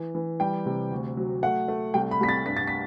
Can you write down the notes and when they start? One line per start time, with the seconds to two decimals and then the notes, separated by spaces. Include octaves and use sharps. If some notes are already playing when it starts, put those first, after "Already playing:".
Already playing: E3
0.15 E3
0.40 G3 G5
0.66 C3
0.91 D2
1.17 F#3
1.43 A3 F#5
1.68 A3
1.94 C2 G5
2.11 B5
2.20 C2 B6
2.29 A6
2.46 G2 B6
2.57 A6
2.67 B6